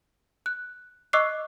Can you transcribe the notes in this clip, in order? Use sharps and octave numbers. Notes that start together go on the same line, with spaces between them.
F#6
D#5 C#6 D6 E6 F#6 C7